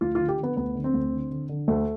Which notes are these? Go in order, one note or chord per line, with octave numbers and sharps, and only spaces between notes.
D2 F4
D3 F4
G4
D3
B3
D2 B3
D3
C4
D2
D3
D3
D3
D2 A3